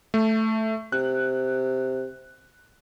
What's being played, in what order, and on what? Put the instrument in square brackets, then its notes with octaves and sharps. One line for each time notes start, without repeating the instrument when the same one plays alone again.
[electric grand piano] A3
[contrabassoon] C3 [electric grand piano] F#6